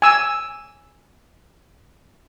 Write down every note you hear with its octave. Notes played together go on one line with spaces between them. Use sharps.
G#5 E6